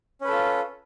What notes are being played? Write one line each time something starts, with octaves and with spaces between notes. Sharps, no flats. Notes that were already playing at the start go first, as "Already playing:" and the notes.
C#4 F4 A4 B4